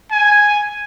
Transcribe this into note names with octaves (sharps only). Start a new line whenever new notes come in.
G#5